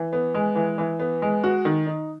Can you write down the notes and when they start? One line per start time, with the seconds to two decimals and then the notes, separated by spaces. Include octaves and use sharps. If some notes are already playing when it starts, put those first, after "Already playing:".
Already playing: E3
0.13 B3
0.35 G#3
0.56 E3
0.78 E3
0.99 B3
1.22 G#3
1.44 F#4
1.65 D#3
1.86 D#4